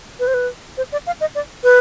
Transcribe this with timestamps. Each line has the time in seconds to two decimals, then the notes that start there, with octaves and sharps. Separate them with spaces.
0.20 B4
0.27 C5
0.34 B4
0.77 C5
0.92 D5
1.07 F5
1.21 D#5
1.35 D5
1.64 B4